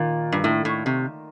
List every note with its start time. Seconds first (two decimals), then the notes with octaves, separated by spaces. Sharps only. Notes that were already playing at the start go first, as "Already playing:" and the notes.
Already playing: A#2 D#3 A#3 F4 A#4
0.32 G2
0.44 A2
0.65 A2
0.86 C3